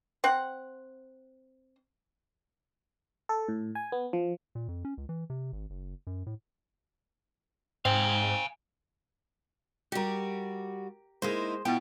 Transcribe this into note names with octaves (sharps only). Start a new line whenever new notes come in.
C4 F#5
A4
A2
G#5
B3
F3
A#2
F2
C#4
C#2
E3
C3
G#1
F#1
F#2
A2
G#2 C4 F5 G#5
G3 F#4 G4 A#4
G#3 A#3 D#4 E4 C5
B2 B3 E4 F4 G5